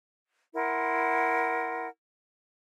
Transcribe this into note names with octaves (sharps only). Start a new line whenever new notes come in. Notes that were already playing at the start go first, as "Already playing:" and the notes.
E4 A#4 F#5 C6